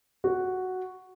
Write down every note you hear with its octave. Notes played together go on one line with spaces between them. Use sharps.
F#4